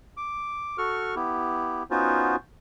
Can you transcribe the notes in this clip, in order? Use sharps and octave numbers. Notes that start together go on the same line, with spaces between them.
D6
F#4 A4 C#6 F6
B3 E4 G4
B3 C#4 D#4 F4 F#4 C5